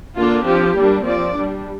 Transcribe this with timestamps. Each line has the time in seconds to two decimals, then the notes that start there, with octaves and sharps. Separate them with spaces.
0.16 D3 A#3 D4 F4
0.46 F3 C4 G4
0.76 G3 A#3 D4
1.05 F3 C4 D5
1.34 G3 D4